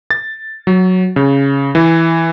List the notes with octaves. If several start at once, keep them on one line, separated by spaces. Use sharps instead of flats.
A6
F#3
C#3
E3